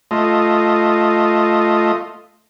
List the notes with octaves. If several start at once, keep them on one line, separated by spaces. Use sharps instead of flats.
A3 F4 D#5